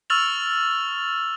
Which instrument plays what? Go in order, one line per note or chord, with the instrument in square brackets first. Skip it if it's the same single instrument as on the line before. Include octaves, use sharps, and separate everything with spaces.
[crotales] C#6 E6 F6 A6 F7 F#7